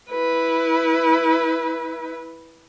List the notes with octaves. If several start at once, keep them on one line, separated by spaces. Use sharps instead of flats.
E4 B4